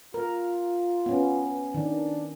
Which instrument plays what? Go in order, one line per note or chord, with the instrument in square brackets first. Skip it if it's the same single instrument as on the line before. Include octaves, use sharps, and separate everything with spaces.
[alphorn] F4 [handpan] A#4
[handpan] B3 C#4
[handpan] D#3 [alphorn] D4